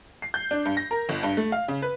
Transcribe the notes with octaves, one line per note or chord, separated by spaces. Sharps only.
C7
G6
D4
G2
A#6
A#4
G1
G2
A3
F5
C#3
B4